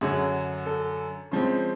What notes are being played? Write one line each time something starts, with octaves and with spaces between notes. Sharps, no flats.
F#2 D3 F#3 G#4
A4
C#3 F3 G#3 C4